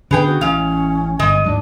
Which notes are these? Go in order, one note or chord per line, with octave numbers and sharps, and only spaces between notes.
D3 B3 C#4 D4 G#4 B4 G5
F#4
A1 G#3 C#4 F5
G1 G2 G#3 D#5
D2 G#2 F#3 D4